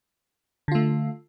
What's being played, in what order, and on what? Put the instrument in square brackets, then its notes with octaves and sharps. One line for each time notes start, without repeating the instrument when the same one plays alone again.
[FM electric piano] D3
F4
A3